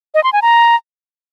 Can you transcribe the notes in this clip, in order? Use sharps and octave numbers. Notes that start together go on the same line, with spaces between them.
D#5
C6
G#5
A#5